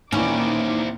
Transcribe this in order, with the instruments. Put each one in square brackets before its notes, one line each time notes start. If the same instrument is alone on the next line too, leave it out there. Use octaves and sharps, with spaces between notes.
[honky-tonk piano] D#2 E3 [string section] A#2 D#4 D6 [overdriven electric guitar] C4 E4 [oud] C#4